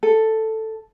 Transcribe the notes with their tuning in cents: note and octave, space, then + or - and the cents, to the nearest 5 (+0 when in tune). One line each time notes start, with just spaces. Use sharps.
A4 +5